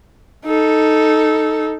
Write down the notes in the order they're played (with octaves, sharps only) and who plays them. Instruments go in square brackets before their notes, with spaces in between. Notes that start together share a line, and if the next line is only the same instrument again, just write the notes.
[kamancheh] D#4 A4